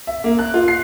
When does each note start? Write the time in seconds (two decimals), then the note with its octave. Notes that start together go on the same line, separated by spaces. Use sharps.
0.07 E5
0.24 A#3
0.39 F#6
0.54 F4
0.68 C7